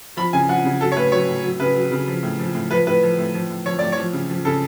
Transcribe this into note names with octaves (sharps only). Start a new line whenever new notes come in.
F3 B5
C#3 G#5
F3 F#5
C#3
F#3 A4
C#5
A2 B4
F#3 C#5
A2
F#3
C#3 B4
F#3
C#3
F3
A2
F3
A2
F3 B4
A2 B4
F3
A2
F3
A2
F3 C#5
A2 D5
C#5
F3
C#3
F3
C#3 A4